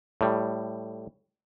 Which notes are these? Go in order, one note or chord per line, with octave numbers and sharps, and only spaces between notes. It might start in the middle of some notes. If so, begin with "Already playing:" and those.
A2 G3